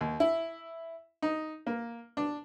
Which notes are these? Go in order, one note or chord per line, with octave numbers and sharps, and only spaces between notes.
D#2
E4
D#4
A#3
D4